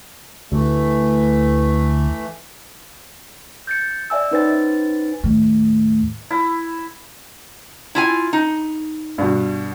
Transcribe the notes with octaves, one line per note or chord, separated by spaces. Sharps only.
D2 E3 A3
G6 A6 C#7
D5 E5 G#5 E6
C#4 D#4 B4 C5 G#5 A6
D#2 A2
E4
E4 F4 G#5
D#4
G2 B2